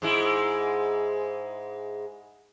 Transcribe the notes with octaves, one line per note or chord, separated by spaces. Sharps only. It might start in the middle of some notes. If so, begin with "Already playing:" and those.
G#2 G#3 E4